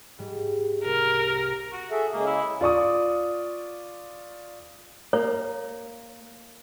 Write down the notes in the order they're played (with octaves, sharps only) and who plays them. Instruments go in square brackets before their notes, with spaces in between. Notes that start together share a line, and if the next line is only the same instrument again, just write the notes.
[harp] G#2 G3
[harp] C2 C4 [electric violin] A#4
[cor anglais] F#4
[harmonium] G#4 A4 E5
[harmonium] C#3 G#3 G#4 [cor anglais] A#3
[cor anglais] E4
[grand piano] F4 D5 C#6 D#6
[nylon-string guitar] A#3 [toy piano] C#5